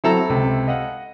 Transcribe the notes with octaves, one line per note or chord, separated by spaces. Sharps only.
F#3 C4 E4 A4 A#5
C#2 C3
D#5 F5 F#5